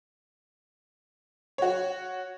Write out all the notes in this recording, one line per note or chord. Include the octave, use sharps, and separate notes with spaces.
F#4 C#5